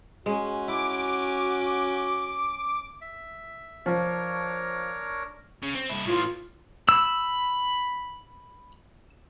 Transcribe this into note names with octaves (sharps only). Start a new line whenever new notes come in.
G#3 C#4 F#4
E4 D6
E5
F3 D4 A#4 C#5
C#3
C4
G2 E4
A2 E3 F4
B5 E6